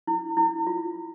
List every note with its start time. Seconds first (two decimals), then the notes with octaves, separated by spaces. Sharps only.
0.08 E4
0.37 E4
0.67 F4